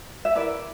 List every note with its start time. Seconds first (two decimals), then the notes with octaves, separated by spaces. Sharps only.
0.25 E5
0.35 E4 A#4 B4 D5